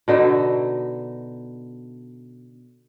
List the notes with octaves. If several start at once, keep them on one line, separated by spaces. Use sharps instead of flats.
B2 D3 D#4 E5